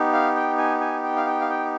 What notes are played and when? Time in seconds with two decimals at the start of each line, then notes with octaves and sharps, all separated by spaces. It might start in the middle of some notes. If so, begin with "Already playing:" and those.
Already playing: B3 D#4 G4
0.13 F5
0.36 G5
0.58 G#5
0.81 G#5
1.04 G5
1.17 F5
1.27 G5
1.41 F5
1.49 G5